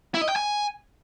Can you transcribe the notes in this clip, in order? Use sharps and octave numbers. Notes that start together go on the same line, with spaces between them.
E4
D#5
G5
G#5